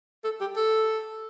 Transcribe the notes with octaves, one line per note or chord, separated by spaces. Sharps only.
A4
G4
A4